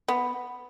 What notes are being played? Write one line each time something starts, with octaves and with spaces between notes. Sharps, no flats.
B3